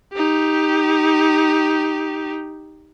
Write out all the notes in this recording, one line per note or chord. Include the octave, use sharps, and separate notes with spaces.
D#4 G4